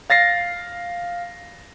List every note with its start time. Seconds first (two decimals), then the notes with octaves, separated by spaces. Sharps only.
0.10 F5 A6 A#6 C7